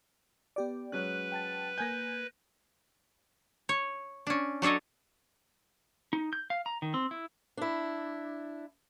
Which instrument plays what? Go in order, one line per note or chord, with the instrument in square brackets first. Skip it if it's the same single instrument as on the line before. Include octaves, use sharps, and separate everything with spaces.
[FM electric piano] B3 G4 D5
[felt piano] F#3 G#3 C#4 [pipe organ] B4 [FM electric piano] F#6
[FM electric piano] G5 A5 A6
[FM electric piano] A#3 G6 [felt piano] G#5 G#6 A#6
[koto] C#5
C#4 D4
F#3 D4 A4 C#5 D#5
[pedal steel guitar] D#4
G6
F5
A#5
D#3
C4
E4
[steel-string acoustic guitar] D4 E4